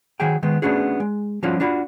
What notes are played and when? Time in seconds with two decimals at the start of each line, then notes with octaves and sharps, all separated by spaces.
0.20 D#3 F#3 F#4 G#4 G5
0.43 D#3 G#3 B3
0.62 A3 B3 C#4 D4 F#4 G#4
1.00 G#3
1.43 F3 G3 C#4 D#4 F4 F#4
1.60 D4 F4 F#4 B5